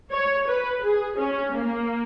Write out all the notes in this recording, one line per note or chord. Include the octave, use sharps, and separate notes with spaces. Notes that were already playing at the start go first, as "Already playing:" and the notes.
C#5
B4
G#4
C#4
A#3